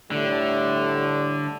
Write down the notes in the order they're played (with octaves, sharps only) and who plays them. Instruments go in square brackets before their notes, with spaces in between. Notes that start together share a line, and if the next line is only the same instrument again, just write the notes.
[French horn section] A2 G3 A3 [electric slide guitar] D3